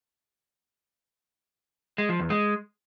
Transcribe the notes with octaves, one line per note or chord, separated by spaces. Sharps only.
G#3
F3
E2
G#3